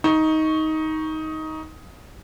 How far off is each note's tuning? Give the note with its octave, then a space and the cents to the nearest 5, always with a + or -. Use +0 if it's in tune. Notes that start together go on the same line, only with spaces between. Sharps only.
D#4 +15 C#6 +0